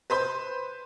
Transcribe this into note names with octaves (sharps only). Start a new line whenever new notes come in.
B4 C5 B5 G6